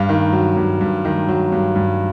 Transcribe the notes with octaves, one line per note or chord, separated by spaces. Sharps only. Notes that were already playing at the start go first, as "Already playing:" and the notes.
Already playing: G2 F5
D#3
F#3
G2
G2
D#3
F#3
G2
G2